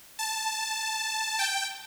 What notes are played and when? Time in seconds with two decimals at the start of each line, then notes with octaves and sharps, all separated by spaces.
0.19 A5
1.39 G5